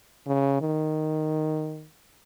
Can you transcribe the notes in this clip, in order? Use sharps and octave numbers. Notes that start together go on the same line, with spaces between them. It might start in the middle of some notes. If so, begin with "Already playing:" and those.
C#3
D#3